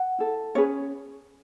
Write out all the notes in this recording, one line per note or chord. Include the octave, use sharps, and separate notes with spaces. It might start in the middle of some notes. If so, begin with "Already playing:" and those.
Already playing: F#5
E4 A4
C#4 G#4 B4 C#5